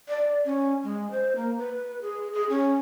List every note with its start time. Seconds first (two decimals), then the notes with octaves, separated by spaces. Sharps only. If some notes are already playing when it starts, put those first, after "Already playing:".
0.09 D5
0.46 C#4
0.84 G#3
1.11 C5
1.36 A#3
1.58 B4
2.02 G#4
2.33 G#4
2.50 C#4